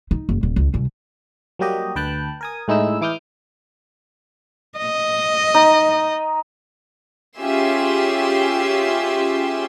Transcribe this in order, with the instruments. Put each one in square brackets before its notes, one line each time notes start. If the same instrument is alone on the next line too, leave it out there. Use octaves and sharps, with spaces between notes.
[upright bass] D#4
F#1
D#1
C#2
C2
[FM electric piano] F#3 G3 A#3 F#4 G4 D#5
D2 B4 G5 A5 F#6
A#4 G#5 D#6
A2 G#3 D#4 E4 E6
E3 E4 D6 D#6 F6 G6
[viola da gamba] D#5
[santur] D#4
[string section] C#4 F4 G4 G#4 E5 C6